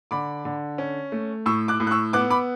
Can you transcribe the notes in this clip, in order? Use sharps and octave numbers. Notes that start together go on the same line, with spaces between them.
D3 B5 D6
D3
C#4
A3
A2 C#6 E6
D6 F#6
A2
F#6
C#6 E6
B3 D6 F#6
B5 D6